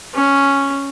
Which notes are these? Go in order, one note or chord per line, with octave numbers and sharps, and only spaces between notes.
C#4